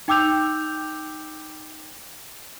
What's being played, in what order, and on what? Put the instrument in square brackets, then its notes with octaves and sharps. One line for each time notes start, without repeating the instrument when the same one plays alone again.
[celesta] D#4 G5 D6 E6 G6 F7